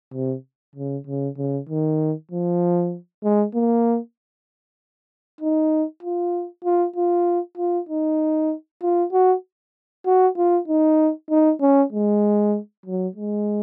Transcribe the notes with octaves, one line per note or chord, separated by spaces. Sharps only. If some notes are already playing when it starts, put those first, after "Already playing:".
C3
C#3
C#3
C#3
D#3
F3
G#3
A#3
D#4
F4
F4
F4
F4
D#4
F4
F#4
F#4
F4
D#4
D#4
C#4
G#3
F#3
G#3